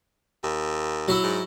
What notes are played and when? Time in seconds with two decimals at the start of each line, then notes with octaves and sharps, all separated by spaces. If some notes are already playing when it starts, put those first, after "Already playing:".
0.43 D#2
1.08 F#3 E4
1.23 G#2